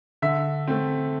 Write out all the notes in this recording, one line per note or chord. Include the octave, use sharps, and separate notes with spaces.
D3 E5
A3 C4